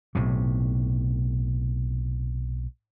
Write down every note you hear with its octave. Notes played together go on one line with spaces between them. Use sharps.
B1 A2 C3